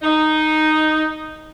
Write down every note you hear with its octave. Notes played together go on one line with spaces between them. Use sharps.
D#4